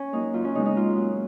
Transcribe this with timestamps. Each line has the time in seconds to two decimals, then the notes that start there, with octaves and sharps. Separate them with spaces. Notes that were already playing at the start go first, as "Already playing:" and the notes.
Already playing: C#4
0.13 F#3 A#3 D#4
0.34 F#2 F4
0.44 C#4
0.55 C#3 G#3 B3 D#4
0.65 D#4
0.76 G#2 F4
0.96 F#3 A#3